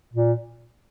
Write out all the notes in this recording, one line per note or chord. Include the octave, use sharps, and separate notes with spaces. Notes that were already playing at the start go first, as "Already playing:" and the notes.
A#2